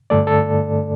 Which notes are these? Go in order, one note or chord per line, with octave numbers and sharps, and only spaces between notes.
G2 D3 A3 A4 D5
A4